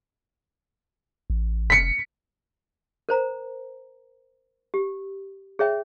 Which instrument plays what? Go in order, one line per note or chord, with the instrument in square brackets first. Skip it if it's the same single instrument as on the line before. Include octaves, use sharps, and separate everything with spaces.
[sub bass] A1
[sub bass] F1 [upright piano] B6 C#7
[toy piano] A#4 C5 A#5
G4
G#4 C#5 E5 G5